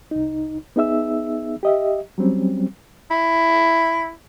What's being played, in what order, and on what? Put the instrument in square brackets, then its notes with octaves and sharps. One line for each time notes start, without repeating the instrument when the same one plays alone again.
[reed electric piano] C2 D#4
B3 D#4 G#4 E5 E6
G4 D#5 E5
F#3 G3 C4 C#4
[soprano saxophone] E4